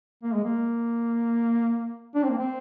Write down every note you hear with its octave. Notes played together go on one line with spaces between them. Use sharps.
A#3
G#3
A#3
D4
C4
A#3
C4